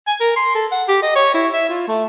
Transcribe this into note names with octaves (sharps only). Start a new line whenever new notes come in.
G#5
A#4
C6
A4
F#5
G4
D#5
C#5
E4
E5
F4
A3